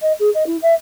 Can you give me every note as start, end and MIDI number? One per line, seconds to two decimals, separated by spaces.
0.02 0.12 75
0.19 0.30 68
0.34 0.46 75
0.46 0.56 64
0.62 0.74 76